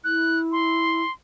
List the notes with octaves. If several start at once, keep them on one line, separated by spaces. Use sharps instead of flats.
E4 F#6
C6